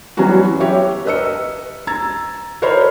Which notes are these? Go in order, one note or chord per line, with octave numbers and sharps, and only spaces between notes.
E3 F#3 G3 B3 C#4 F#4
G4 C#5 E5
A#4 B4 D#5 E6 C#7
A#5 E6 G#6 A6
A4 A#4 C5 C#5 D#5 B5